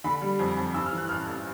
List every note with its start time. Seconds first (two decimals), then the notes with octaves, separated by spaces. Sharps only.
0.04 D3 B5
0.22 G3
0.39 F2
0.57 F2
0.74 G2 E6
0.86 F6
0.92 E3
0.98 F#6
1.09 A1 F6
1.26 A1